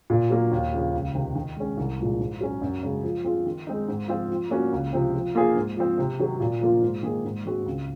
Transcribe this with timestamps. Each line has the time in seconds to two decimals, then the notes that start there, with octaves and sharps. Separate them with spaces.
0.10 A#2
0.30 F#3 A#3
0.52 D#2
0.73 C#3 F3
0.94 C#2
1.15 C3 D#3
1.35 D#3
1.57 G#3 C#4
1.77 C2
1.99 A#2 F3 G#3
2.20 G#2
2.41 F#3 C#4
2.62 F#2
2.83 C#3 G#3 C#4
3.03 F3
3.24 C4 F4 G#4
3.46 D#3
3.67 G#3 C4 D#4
3.88 G#2
4.08 F3 C4 F4
4.30 F3
4.50 A#3 C#4 F#4
4.73 C#2
4.93 C3 F3 C4
5.14 F3
5.35 A#3 F4 G#4 C5
5.56 G#2
5.77 F3 C4
5.98 C3
6.19 D#3 F#3
6.40 A#2
6.61 F3 A#3 F4
6.82 G#2
7.03 D#3 A#3 D#4 G#4
7.25 G#2
7.45 D#3 G#3 C4 F#4
7.66 C#2